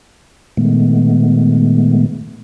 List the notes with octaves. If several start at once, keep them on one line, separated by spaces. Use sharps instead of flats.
A#2 D#3 G#3 A3 B3